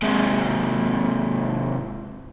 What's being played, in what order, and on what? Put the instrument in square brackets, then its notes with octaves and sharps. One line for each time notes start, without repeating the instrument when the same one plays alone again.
[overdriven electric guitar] G#2 C3